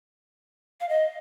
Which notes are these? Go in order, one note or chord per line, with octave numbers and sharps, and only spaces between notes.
F5
D#5